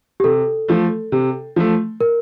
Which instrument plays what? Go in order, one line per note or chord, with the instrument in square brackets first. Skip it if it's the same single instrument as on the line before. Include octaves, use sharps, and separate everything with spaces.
[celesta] G4
[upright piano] C3 [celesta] A4
[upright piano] F3 A3
C3
F3 A3
[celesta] A#4